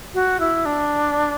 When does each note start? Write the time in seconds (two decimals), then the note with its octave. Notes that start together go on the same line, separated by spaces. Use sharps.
0.14 F#4
0.40 E4
0.66 D4